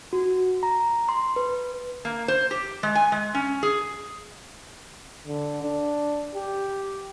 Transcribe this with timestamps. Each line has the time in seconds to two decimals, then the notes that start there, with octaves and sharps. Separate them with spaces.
0.13 F#4
0.63 A#5
1.09 C6
1.36 B4
2.05 A#3
2.28 C5
2.51 G4
2.83 G#3
2.95 G#5
3.12 G#3
3.34 C#4
3.63 G#4
5.27 D3
5.63 D4
6.35 G4